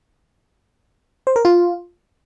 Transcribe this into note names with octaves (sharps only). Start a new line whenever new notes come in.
C5
A#4
F4